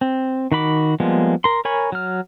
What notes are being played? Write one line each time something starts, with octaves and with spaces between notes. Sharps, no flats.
C4
D#3 F#4 B5 D6
F3 G3 G#3 A#3 B3
A#4 C6
A#4 C#5 G#5 B5 C#6
F#3 F6